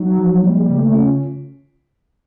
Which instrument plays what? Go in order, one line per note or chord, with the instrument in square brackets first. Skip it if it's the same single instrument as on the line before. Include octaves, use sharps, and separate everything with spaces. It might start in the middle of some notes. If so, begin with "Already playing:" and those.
Already playing: [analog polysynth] F#3 [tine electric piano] D#4
[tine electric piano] F3
[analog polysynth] G3 [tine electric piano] A#3
[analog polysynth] G#3
G3
[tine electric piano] C#3
[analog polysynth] A3
[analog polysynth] C#4 [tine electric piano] F4